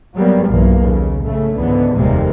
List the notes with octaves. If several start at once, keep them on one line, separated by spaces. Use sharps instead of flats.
F#3 G3 A#3 B3
B1 G2 E3 A#3
D#2 C#3
G#2 C#3 A3
C#2 G#2 D3 E3 B3
F1 D#2 C3 G3 G#3 A#3